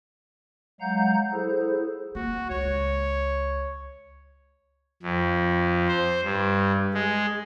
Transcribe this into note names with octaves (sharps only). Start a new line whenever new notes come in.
F#3 G#3 F5 F#5 A#5 G6
E4 G#4 A4 C5
A#3 F#4
C#2 C#5
F2
C5
G2
G#3